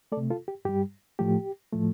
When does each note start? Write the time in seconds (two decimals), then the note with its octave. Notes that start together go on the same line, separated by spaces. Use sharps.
0.12 A3 A4 D5
0.17 C3
0.30 F4 A4
0.48 G4
0.65 G2 G3 G4
1.19 A2 F3 A3 G4
1.72 A2 F3 A3